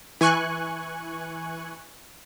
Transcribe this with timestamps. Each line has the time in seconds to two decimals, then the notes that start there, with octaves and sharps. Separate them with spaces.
0.21 E3 G#5 C#6 F#6